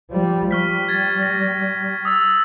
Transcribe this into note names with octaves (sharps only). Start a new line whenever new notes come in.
F3 G3
G3 C#6 F6 B6
G#6 A6
A#6
D#6 E6 A6